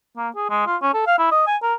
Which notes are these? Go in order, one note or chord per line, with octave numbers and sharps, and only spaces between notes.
A#3
G#4
G#3
F4
C#4
A4
F5
E4
D#5
G#5
A#4